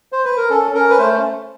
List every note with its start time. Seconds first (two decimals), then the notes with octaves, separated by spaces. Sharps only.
0.12 C5
0.25 B4
0.37 A#4
0.50 C#4 A4
0.74 C#4 A#4
0.90 B4
0.98 A3 C5